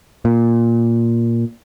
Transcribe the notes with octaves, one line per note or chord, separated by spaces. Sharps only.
A#2